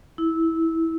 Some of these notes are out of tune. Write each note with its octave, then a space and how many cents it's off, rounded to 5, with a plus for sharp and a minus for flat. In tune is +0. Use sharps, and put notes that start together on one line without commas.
E4 -15